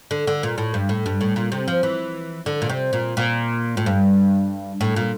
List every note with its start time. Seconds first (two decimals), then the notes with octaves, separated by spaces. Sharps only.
0.11 D3
0.27 D3
0.43 A#2
0.58 A2
0.74 G2
0.89 A2
1.06 G2
1.21 A2
1.36 A#2
1.52 C3
1.68 F3
1.83 E3
2.46 D3
2.62 A#2
2.69 C3
2.93 A#2
3.17 A#2
3.77 A2
3.86 G2
4.81 A2
4.96 A#2